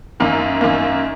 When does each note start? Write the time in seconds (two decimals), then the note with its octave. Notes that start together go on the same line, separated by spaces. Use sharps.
0.20 F#2 D#3 A#3
0.61 F#2 D#3 A#3